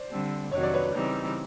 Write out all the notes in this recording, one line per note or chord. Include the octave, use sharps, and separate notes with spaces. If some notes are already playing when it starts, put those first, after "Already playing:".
Already playing: C5 D5
D3 G3 C4
F2 C3 D#3 F#3 C#5
D5
B4 C#5
C#3 E3 G3 C4 D#4